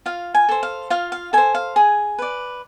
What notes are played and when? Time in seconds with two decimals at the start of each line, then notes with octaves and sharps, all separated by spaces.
0.06 F4 F5
0.34 G#5
0.49 A4 C5
0.63 F5
0.90 F4 F5
1.12 F5
1.33 A4 C5 G#5
1.55 F5
1.76 G#4 G#5
2.18 B4 D5